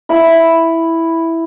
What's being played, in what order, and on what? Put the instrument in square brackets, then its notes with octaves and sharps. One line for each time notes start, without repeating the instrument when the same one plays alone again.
[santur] E4 B5